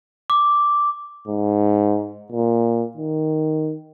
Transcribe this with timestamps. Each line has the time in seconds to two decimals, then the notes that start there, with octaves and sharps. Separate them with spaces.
0.30 D6
1.28 G#2
2.32 A#2
2.97 D#3